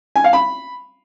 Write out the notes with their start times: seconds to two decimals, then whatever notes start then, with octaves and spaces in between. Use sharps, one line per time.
0.16 G#5
0.24 F5
0.33 B5